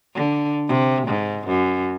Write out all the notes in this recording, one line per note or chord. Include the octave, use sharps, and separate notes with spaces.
D3
C3
G#2
F#2